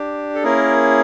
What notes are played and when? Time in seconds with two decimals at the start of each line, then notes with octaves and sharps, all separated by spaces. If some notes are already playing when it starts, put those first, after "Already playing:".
Already playing: D4 G4
0.35 A4
0.43 A#3 C#4 E4 G#4 A#4